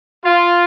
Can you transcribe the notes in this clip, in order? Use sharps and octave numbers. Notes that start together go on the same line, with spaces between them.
F4